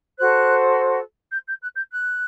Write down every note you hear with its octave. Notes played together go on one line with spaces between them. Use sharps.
F#4 A4 C5 F#6
G6
G6
F#6
G6
F#6